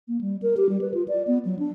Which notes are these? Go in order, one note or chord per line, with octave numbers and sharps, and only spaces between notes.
A#3
G3
A#4
G4
G3
B4
F4
D5
B3
F#3
D4